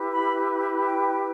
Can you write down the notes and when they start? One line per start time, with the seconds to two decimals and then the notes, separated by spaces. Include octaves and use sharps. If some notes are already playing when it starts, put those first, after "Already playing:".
Already playing: E4 G4 B4
0.13 B5
0.85 G5